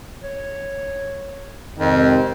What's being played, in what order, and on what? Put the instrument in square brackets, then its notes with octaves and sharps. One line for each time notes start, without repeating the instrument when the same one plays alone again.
[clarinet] C#5
[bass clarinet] F2 [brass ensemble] G#2 C3 D#3 [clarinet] C4